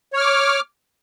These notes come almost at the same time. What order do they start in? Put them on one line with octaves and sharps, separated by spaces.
C#5 F6 D6